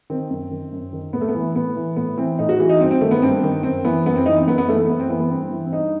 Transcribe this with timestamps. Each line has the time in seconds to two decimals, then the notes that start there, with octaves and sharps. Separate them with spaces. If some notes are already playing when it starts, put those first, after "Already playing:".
0.10 D#3 C4
0.30 F#2
0.51 D#3
0.72 F#2
0.93 D#3
1.13 A2 B3
1.21 A3
1.28 B3
1.35 E3
1.55 A2 B3
1.76 E3
1.96 A2 B3
2.17 E3 C4
2.39 A2 D#4
2.49 F#4
2.59 E3 F#4
2.69 D#4
2.80 G2 C4
2.91 C4
3.01 D#3 A3
3.11 B3
3.22 G2 C4
3.43 D#3
3.63 F#2 C4
3.85 E3 B3
4.06 F#2 B3
4.16 C4
4.26 E3 D#4
4.37 C4
4.47 F#2 B3
4.58 B3
4.68 E3 A3
4.78 A3
4.89 F#2 B3
5.00 C4
5.09 E3 B3
5.20 B3
5.31 G2 C4
5.52 E3
5.66 C4
5.72 G2 D#4